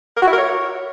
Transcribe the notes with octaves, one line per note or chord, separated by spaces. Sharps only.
A#4
F#4
E4
A#4
C#5